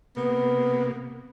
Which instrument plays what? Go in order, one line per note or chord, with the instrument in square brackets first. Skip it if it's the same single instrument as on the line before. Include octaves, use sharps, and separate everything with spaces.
[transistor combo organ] C3 A#3 [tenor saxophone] B3